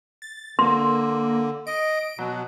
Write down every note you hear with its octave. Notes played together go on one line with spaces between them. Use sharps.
A6
D3 A#3 C6
D#5 D7
B2 F#3